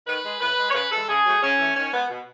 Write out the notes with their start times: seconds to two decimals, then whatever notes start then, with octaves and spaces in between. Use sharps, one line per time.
0.07 D#3 B4
0.24 G#3
0.41 A2 B4
0.57 G#3
0.70 C#5
0.74 C#3 B4
0.91 E3 G#3 A4
1.08 C#3 G#4
1.25 F#3 A3
1.42 C#3 C#4
1.59 E3 A3
1.76 D#3 C#4
1.93 G#3 B3
2.10 B2